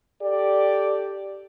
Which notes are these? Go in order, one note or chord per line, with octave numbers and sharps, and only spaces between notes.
G4 A4 D5